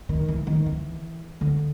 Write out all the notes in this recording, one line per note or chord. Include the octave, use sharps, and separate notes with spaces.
D#3
E3
D#3
E3
D3